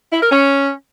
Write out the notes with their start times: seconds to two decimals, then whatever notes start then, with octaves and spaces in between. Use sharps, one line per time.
0.11 E4
0.21 A#4
0.31 C#4